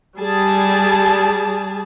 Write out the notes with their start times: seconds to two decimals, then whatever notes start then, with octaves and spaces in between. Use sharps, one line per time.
0.19 G3 G#4 A5